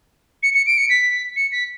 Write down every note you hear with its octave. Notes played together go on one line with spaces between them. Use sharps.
C#7
C#7
D7
C#7
B6
C#7
B6